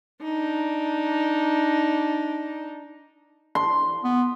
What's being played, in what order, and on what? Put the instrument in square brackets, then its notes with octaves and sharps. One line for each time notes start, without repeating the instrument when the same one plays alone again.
[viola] D4 D#4
[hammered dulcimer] C6
[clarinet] B3